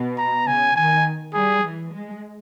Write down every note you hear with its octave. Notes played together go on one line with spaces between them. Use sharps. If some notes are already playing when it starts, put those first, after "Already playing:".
Already playing: B2
A#5
C#3 G#5
D#3 G#5
G3 G#4
E3
G#3